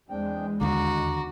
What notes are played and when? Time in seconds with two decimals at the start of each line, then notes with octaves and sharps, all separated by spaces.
0.10 E2 G#3 C4 D4 G5
0.61 D#2 D3 F#4 A#5 D6